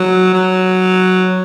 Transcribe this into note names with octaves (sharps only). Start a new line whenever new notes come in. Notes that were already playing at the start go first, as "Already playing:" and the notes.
Already playing: F#3
F#3